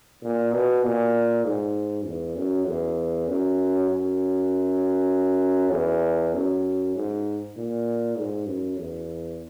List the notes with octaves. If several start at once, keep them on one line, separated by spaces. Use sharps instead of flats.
A#2
B2
A#2
G#2
E2
F#2
E2
F#2
F#2
E2
F#2
G#2
A#2
G#2
F#2
E2